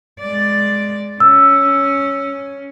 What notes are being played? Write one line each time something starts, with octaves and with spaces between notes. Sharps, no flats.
G#3 D5
C#4 E6